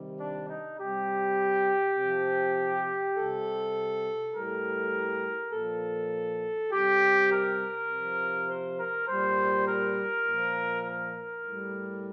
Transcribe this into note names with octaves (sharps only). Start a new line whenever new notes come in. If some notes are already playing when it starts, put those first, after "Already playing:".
Already playing: C3 D#3 G3
D4
D#4
C3 G3 G4
C3 F3
C3 G3 A4
A2 G3 A#4
A#2 F3 A4
C3 G3 G4
A#4
C3 F3
C5
A#4
A#2 G3 C5
A#4
A#2 F3
A#4
A2 G3